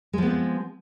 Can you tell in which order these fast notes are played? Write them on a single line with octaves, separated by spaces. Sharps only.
G#3 F3 B3 C4